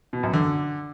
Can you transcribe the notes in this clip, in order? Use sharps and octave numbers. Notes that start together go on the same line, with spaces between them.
B2
F#2
D3